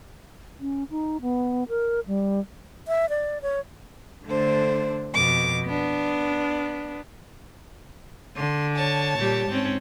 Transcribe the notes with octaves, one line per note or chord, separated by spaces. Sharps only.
C#4
D#4
B3
A#4
G3
E5
D5
C#5
D3 A3 D4 C5
F2 B2 D6
B3 D4
D3 C6
C#5 A5
A#2 G3 G4
G#2 C4 C#4